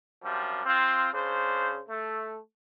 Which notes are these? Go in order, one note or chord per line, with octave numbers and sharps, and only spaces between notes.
F#2 C3 F3 G3
C4 F4
C#3 D4 C5
A3